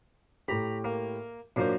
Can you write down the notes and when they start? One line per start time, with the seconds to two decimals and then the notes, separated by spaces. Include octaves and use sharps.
0.48 A2 G4 A#5 B5
0.84 A#3
1.56 F#2 A#2 A#3 D4 C5 C7